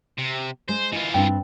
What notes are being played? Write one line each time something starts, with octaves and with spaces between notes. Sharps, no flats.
C3
G#3 C5
E3 F4 D#5
G2 C4 D4 G5